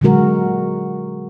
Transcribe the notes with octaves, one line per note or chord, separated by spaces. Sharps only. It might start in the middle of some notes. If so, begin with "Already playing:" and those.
A#2 D3 F#3 G#3 F#4 A#4